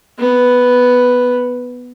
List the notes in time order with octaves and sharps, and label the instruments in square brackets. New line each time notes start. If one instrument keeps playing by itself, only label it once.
[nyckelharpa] B3